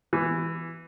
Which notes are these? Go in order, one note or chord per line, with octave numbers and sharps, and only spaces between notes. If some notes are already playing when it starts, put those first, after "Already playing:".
E3